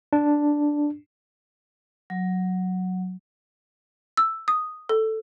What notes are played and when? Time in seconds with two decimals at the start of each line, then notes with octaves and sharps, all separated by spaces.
0.13 D4
2.10 F#3
4.17 E6
4.48 D#6
4.89 A4